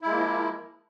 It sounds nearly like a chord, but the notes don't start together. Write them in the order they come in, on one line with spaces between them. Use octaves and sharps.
E4 G#3 A#3 F3